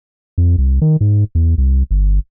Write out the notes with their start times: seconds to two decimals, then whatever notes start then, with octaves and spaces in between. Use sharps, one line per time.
0.38 F2
0.58 C2
0.82 D#3
1.01 G#2
1.35 E2
1.58 C2
1.91 G1